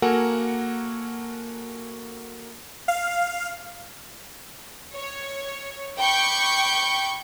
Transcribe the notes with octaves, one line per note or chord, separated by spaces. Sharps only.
A#3 F#4 A4 A#4 F#5 G#5
F5
C#5
G5 B5 C#6 D6 G6